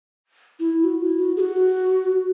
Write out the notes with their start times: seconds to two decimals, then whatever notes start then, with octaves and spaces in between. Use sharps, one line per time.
0.60 E4
0.84 F#4
1.02 E4
1.19 F#4
1.37 G#4
1.40 F#4